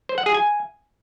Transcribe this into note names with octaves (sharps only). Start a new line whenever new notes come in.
C5
F#5
G#4
G#5